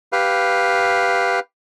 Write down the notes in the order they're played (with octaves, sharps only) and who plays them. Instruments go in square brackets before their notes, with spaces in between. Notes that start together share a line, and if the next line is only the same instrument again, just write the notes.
[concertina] G4 B4 F5